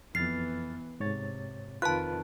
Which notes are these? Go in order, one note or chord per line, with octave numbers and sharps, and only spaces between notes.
F2 E3 B3 F6 A6 C7
G#2 C3 C#5 A6
F2 D#3 F4 B4 A5 F#6